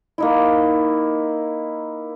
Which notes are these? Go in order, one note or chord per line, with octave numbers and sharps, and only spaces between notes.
A#3 D#4 E4